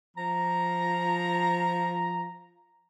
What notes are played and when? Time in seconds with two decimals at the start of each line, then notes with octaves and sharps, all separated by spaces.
0.16 F3 A#5